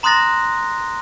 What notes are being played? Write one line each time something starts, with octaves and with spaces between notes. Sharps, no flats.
A#5 C6 D#6 F#6 A6 A#6